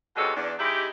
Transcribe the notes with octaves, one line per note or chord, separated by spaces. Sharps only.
F2 B2 G3 G#3 C#4 A4
E2 D4
G#3 D#4 E4 G4